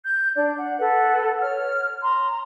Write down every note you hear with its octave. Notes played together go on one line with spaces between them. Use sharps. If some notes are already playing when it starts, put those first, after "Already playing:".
G6
D4 D5
F#5
A4 B4 F#5
C#5 F6
A#5 C6